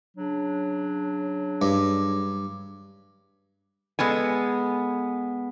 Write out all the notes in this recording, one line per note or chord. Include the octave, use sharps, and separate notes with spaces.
C#3 F#3 D4
G2
G#3 B3 A4 G#5